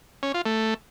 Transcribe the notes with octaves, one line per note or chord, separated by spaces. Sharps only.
C#4
F4
A3